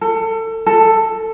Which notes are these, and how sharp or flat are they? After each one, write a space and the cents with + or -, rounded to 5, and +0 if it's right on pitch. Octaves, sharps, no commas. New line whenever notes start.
A4 +30
A4 +10